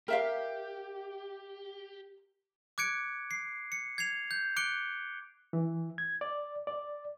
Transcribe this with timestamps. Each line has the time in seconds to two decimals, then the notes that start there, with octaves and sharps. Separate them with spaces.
0.08 G4 A#4 E5 F5
2.78 D6 F#6 G#6 C#7 D7
3.31 C7
3.72 C#7
3.98 G#6 C7 F7
4.31 G6
4.56 D6 F#6 C#7 D7 G7
5.53 E3
5.98 G#6
6.21 D5
6.67 D5